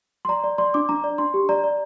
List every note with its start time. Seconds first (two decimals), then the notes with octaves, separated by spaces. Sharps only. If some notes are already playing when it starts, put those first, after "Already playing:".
0.25 C6
0.29 D5 A#5
0.44 D5
0.58 D5 C6
0.74 D4 D6
0.89 D4 A#5
1.04 D5
1.18 D4 C6
1.34 G4
1.49 D5 A#5
1.64 D5